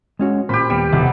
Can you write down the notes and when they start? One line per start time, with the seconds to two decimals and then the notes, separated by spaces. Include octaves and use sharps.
0.19 G#3 C#4 F#4
0.49 A#2 G4 C5 B5
0.70 D#2 G3 B3
0.93 F1 B2